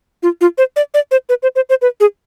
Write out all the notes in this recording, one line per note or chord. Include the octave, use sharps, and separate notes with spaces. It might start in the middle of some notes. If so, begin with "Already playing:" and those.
F4
F4
C5
D5
D5
C5
B4
C5
C5
C5
B4
G#4